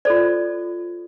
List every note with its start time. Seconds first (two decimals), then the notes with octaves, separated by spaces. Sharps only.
0.05 F4 A4 C5 D5